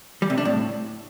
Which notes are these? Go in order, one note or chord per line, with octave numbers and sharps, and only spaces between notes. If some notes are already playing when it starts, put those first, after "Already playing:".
G3
C3
D4
A2